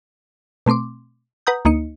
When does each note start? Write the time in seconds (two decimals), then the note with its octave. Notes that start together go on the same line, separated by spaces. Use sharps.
0.66 B2 A3 C4 C6 D6
1.47 B4 F#5 A#5 D#6 G6
1.65 D2 A#3 D#4 D#5 C#7